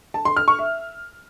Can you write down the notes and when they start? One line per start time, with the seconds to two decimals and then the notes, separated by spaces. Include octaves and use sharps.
0.14 A5
0.25 C6
0.37 F6
0.48 C#6
0.59 E5